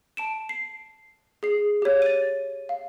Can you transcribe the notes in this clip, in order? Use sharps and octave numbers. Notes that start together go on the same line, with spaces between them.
A5 D7 E7
C7
G#4 C7
G4 C#5
A6 D#7
F5